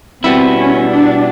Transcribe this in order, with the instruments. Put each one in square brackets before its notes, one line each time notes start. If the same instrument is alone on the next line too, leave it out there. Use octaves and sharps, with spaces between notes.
[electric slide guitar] B2 G3 B3 E4 [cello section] C4
[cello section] C#4
D4